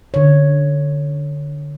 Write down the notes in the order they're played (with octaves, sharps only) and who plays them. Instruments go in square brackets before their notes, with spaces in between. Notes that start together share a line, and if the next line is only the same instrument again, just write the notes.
[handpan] D3 C#5